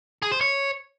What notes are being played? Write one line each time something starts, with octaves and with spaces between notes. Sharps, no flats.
G#4
C5
C#5